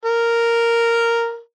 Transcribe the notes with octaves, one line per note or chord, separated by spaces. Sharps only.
A#4